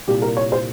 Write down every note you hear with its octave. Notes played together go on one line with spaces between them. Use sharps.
C2 A#2 G4
A#4
C#5
C5